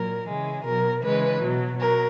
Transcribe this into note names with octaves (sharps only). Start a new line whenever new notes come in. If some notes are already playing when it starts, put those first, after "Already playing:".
Already playing: A#2 F#3 A#4
C#3 E3 G#3
B2 F#3 A#4
C#3 E3 G#3 B4
B2 F#3
F#3 A#4